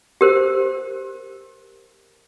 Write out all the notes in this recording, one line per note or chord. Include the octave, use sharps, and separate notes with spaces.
G4 A#4 C5